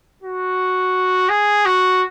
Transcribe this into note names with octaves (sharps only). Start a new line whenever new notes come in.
F#4
G#4
F#4